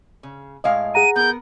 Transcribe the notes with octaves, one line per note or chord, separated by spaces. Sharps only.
C#3
A2 G#3 D#5 F5
G#4 F#5 A#5 D#7
B3 A#4 G6